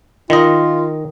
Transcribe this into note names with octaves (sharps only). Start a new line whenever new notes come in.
D#3 F4 D#5